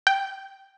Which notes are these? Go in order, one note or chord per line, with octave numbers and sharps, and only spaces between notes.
G5